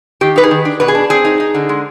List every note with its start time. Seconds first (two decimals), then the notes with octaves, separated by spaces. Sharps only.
0.21 D#3 G4
0.36 D#4 B4
0.43 G#4
0.51 D#3
0.65 D4
0.80 B2 B4
0.88 G#4
0.95 D4
1.10 C4 G#4
1.25 D#4
1.40 D#4
1.54 D3
1.69 G#3